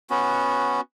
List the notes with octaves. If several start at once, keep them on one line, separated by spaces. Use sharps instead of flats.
B3 C#4 F#4